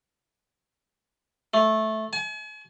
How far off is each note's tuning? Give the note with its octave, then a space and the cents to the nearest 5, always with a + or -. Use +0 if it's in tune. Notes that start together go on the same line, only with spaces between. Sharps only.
A3 -10
G#5 +40